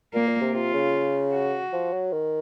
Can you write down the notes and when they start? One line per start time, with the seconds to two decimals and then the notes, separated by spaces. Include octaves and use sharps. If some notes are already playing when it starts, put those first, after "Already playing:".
0.13 A#2 A#3
0.28 A#2
0.41 C3
0.54 C3 F4
0.74 C#3
1.33 F#4
1.73 F3
1.93 F#3
2.12 D#3